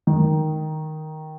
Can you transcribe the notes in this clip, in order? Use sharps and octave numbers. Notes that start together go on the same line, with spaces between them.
D#3